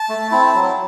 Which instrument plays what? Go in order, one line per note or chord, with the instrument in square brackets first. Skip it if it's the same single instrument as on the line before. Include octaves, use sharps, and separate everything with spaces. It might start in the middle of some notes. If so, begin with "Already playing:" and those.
Already playing: [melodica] A5
A3
C4 E4
F#3